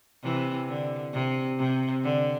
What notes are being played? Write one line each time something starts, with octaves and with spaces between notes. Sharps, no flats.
C3 E3
D3
C3
C3
D3